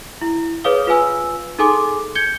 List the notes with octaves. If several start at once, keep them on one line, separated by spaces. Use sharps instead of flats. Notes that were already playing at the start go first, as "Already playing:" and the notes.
E4
G#4 B4 C#5 F5 D#6 G7
F4 B4 F5 G#5 E6
D#4 G#4 A4 G#5 C6 D6
G6 G#6 C#7 G7